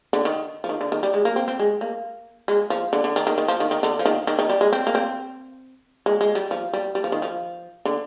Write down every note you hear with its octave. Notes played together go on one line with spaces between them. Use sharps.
D3
D#3
F3
D#3
D3
D#3
G3
G#3
A#3
C4
C4
G#3
A#3
G#3
F3
D3
D3
D#3
D#3
D#3
F3
D#3
D#3
D3
F3
D#3
D#3
D#3
G3
G#3
C4
A#3
C4
G#3
G#3
G3
F3
G3
G3
F3
D#3
F3
D3